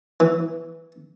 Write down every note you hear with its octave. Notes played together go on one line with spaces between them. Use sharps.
E3